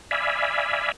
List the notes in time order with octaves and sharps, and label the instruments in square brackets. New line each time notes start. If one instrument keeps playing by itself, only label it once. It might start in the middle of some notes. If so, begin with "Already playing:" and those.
[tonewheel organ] D5 E5 F5 G#5 B5